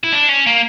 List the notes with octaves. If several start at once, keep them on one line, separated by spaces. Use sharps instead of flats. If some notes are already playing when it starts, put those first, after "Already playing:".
E4
D4
C#4
A#3